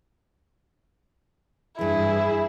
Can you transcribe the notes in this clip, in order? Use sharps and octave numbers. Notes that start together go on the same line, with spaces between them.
G2 E3 E4 G#4